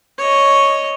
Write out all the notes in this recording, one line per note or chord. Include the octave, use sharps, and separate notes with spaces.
C#5 D#5